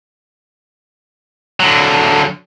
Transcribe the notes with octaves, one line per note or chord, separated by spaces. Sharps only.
D3 F#3